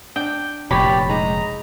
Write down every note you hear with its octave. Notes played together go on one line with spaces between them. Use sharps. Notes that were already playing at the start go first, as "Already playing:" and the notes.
D4 G5
F1 A#2 G4 C#5 D5 B5
G#3 D#4 A#5